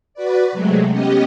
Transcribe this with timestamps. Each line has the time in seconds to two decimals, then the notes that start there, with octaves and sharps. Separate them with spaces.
0.14 F#4 B4 D5
0.52 C3 F#3 G#3 A3
0.90 B3 C#4 G4 D#5